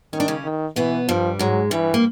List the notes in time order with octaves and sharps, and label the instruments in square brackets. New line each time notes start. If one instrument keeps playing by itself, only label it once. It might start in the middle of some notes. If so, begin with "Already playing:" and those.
[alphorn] D#3 [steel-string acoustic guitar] C#4
[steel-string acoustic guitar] D4
C#3 C#4
[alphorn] D#3
[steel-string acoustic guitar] B2 B3 [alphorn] E3
[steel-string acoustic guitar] G2 G3 [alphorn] F3
[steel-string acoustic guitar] G#2 G#3 [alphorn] F#3
[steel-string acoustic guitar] G2 G3 [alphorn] E3
[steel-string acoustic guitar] A#3